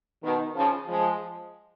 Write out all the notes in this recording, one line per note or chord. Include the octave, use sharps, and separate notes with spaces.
B2 D#3
C#3 F3
F3 G#3